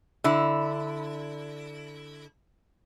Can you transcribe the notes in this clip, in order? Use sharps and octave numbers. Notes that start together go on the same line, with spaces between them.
D3 E4